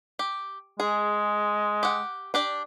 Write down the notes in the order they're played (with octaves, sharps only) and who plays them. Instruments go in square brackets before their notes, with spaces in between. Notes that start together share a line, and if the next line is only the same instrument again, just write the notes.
[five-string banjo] G4
[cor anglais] G#3 [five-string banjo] G#4
[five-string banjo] G4 F#5
D4 G4 D5